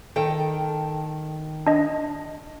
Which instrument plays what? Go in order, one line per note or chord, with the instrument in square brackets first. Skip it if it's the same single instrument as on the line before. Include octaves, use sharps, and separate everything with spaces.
[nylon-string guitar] D#3 A4 G5
[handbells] D4 D#5